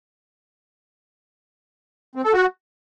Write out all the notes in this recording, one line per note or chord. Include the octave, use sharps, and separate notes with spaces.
C4
A4
F#4